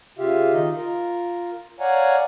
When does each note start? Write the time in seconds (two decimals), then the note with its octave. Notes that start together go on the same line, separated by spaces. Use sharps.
0.19 C#3 F4 G4 E5 F5
0.53 D#3 D#4 F4 D#5
0.76 F4 A#4
1.80 C#5 D5 F5 F#5 G#5 A#5